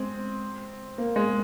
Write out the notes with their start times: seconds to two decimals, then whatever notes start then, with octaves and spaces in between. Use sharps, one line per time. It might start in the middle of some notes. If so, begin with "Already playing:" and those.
Already playing: G#3 C4
0.98 A#3
1.16 G#3